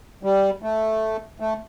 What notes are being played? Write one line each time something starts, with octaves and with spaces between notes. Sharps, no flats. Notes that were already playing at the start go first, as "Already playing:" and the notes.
G3
A3
A3